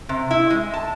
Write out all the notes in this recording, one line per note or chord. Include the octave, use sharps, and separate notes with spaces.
C3
E4
G#3
A5